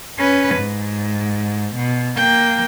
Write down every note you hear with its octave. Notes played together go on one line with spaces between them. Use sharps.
C#4 B4
G#2
B2
A#3 G5